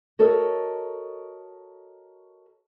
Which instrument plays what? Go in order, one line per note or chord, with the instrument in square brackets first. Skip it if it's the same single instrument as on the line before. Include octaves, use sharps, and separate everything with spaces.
[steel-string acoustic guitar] F#4 A4 A#4 C#5 D#5